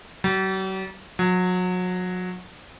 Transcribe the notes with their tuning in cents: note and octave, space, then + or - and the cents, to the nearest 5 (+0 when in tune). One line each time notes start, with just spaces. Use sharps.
F#3 +45
F#3 -30